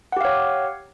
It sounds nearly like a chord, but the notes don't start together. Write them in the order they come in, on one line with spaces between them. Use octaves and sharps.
F#5 G4 F5 C#5